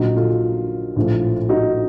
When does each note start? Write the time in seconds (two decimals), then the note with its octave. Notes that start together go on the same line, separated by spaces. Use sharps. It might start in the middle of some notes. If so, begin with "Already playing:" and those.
Already playing: A#1 A#2 F#3 D#4 F#4
0.16 F4 A4
0.96 A#1 A2 F3
1.49 D#4 F#4